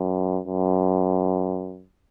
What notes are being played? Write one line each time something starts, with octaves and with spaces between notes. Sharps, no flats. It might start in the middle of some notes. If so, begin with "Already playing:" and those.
Already playing: F#2
F#2